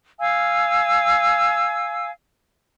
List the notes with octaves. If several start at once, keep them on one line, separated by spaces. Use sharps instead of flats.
F5 G#5 E6